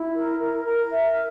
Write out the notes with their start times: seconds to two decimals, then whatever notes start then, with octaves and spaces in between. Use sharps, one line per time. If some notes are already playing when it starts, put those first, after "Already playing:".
Already playing: E4
0.15 A#4
0.39 A#4
0.65 A#4
0.91 E5